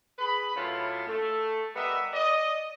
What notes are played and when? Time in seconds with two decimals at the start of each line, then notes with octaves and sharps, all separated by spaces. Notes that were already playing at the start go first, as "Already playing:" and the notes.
0.19 G#4 B4 B5
0.55 F#2 A2 E4 F4 A5
1.07 A3
1.74 G3 B3 A#4 D#5 E5
2.13 D5 D#5